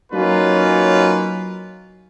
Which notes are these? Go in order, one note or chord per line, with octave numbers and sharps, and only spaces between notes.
F#3 A#3 C#4 D#4 F4 B4